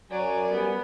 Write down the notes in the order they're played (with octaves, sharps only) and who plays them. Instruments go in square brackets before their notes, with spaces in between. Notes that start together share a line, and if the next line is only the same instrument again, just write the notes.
[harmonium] F#2 G#5 [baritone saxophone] F#3 [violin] C#5 D5
[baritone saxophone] G3 [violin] B3